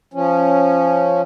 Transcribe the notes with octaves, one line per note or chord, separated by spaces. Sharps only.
F3 C#4